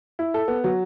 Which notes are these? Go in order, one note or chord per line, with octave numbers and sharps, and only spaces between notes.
E4
A4
B3
F#3